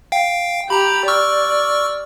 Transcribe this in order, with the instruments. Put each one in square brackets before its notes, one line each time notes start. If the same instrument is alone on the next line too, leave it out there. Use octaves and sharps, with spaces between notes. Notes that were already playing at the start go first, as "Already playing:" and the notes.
[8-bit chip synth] F5 G5
[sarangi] G4 [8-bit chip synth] A#5 B5
[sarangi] D5 [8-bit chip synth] C#6 E6 F6